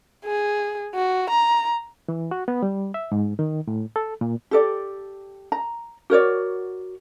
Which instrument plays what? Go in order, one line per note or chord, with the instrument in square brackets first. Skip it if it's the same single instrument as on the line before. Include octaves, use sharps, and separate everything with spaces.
[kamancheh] G#4
F#4
A#5
[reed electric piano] E3
F#4
B3
G3
E5
G#2
D#3
A2
A4
A#2
[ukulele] G4 A4 D5
A#5
F#4 A#4 C#5 D5